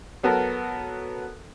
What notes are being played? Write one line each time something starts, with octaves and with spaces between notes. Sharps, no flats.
F#3 B3 F#4 A4 A#4